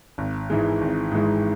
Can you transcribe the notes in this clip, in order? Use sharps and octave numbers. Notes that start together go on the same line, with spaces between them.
G#1
G#2 E3 G#3
G#1
G#2 E3 G#3